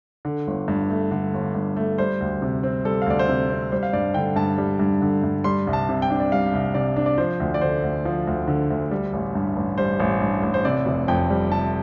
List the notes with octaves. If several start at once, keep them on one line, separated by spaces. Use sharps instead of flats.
D3
G1
G2
A3
D3
G1
G2
A3
G3 C5
D2
C3
C4
G3 A4
F5
D2 D5
C5
C3 A4
C4
G3 C5
F5
G2 D5
D3 G5
G2 A5
G3
G2
D3
G2
G3 C6
C2
A5
C3
G5
D4
D5
G3 F5
C2
C3 D5
D4
D5
F3 C5
D2
D5
D3 C5
D2
F3
D2
D3
D2
G3
A1
G2
A1
G3 C5
A1
G2
A1
C5
C3 D5
F1
F2 G5
G3
C3 A5